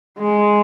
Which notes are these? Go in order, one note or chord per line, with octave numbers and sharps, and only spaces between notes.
G#3